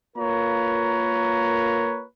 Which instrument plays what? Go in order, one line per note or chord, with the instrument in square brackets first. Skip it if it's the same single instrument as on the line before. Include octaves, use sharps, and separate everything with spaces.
[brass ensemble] A#3 F4 A#4 B4 C#5 A#5